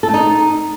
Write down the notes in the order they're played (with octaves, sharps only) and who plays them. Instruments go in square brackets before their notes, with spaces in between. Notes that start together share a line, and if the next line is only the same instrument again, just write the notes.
[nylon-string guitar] A4
A3
D#4